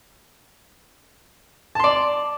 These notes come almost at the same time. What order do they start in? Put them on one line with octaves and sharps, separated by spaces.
A5 C6 D5